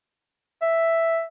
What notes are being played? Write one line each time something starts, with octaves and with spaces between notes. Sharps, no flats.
E5